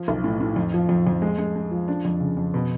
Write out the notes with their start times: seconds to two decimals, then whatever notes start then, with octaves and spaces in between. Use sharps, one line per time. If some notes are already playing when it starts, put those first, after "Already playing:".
Already playing: F3
0.08 B1
0.24 A2
0.40 A2
0.56 F2
0.74 F3
0.89 F2
1.07 F2
1.22 G#3
1.38 G#3
1.56 G#3
1.71 F3
1.88 D4
2.05 F2
2.20 C#3
2.37 F2
2.54 B2